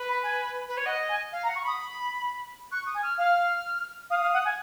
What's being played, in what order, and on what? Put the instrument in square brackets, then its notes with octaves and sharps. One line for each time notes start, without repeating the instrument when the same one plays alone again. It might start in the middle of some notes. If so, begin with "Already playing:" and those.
Already playing: [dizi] B4
[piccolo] B5
G#5
[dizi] B4
C#5
[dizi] D#5 [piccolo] F#5
[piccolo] G#5
[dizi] F5
[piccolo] A#5
[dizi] F#5
[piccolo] C#6
[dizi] B5 [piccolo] D#6
[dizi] C#6 [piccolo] F#6
[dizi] D#6
[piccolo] G#5
[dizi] F6
[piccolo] F5 [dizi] F6
[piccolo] F5 [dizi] D#6
[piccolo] F5
F#5
G#5